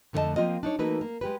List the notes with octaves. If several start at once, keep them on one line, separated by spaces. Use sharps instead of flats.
F2 D3 A3 G#4 D#5 A5
F3 A#3 C4 F4 D#5
D4 D#4 C#5
E3 A3 A#3 D#4 F#4 B4
A#3
G#3 G4 B4